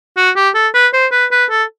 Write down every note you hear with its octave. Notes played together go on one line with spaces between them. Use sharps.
F#4
G4
A4
B4
C5
B4
B4
A4